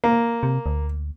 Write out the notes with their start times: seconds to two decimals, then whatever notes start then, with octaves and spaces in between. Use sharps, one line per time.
0.04 A#3
0.43 C3
0.66 D2